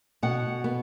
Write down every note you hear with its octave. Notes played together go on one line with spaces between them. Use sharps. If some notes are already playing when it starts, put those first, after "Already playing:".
B2 F#5
B3